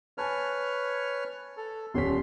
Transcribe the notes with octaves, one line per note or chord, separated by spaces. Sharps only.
B4 C#5 G#5 A5 F6
A4
D#1 C#4 C6 B6